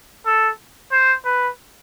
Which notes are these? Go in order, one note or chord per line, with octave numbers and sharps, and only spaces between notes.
A4
C5
B4